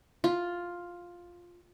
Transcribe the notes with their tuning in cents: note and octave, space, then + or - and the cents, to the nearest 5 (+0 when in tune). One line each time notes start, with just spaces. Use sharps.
F4 +5